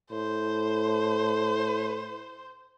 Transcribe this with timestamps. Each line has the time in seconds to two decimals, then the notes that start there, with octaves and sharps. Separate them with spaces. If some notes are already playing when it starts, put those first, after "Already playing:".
0.11 A2 C5